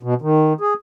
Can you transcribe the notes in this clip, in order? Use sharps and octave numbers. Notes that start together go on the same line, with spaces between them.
B2
D#3
G#4